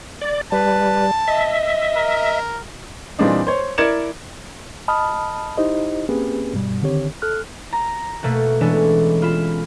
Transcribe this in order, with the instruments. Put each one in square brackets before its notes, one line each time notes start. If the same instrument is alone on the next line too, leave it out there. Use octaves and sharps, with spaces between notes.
[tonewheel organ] D5
[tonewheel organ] G3 [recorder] B4 [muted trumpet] A5
[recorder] D#5 [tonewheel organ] E5
[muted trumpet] A#4
[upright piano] A#2 E3 G3 C4 D4 D#4
C5 C#5
E4 A#4 D5 G#6 C#7 E7
[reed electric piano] D#5 A5 B5 D#6 F6
D#4 E4 G4 C5 D#5
A#3 C4 C#4 G4 G#4 B4
G2 B2 G3
D3 D#3 C4 G4 C#5
A4 F6 F#6
[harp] A#5 A#6
B2 A3 A#3 F#4
E3 G#3 B3 C#4 D4 A4
F4 B5 E7